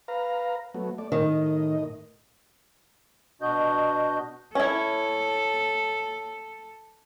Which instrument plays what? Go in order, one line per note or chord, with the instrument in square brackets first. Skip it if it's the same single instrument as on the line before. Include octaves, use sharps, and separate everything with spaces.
[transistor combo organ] B4 F5 A#5
F#3 A3 B3
A3 D5
[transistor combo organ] A2 D#5 [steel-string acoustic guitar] D#3
[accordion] B2 D4 F#4 D#5 G6
[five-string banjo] C#4 E4 [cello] A4